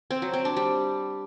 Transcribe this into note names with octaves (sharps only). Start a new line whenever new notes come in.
C4
F#3
C4
D4
G3